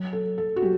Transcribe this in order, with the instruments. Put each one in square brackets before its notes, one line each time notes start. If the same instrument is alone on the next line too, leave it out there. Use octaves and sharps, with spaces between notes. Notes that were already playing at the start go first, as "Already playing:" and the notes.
Already playing: [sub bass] F#3
[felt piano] A4
A4
F#4
[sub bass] F#3 [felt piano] G4